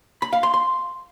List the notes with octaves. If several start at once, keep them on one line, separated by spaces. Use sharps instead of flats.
B5
F5
C6
C6